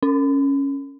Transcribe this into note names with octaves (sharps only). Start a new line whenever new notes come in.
C#4